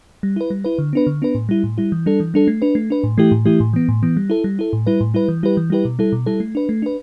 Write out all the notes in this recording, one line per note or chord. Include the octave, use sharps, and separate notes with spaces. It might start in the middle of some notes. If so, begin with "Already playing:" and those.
G3
E4 B4
G3
E4 B4
D3
B3 D4 B4
D3
B3 D4 B4
A2
G3 E4
A2
G3 E4
E3
G3 D4 A4
E3
G3 D4 A4
A3
D4 B4
A3
D4 B4
A2
E3 A3 E4 G4
A2
E3 A3 E4 G4
A2
E3 B3
A2
E3 B3
G3
E4 A4
G3
E4 A4
A2
G3 E4 B4
A2
G3 E4 B4
E3
G3 E4 G4 B4
E3
G3 E4 G4 B4
B2
G3 E4 A4
B2
G3 E4 A4
A3
D4 B4
A3
D4 B4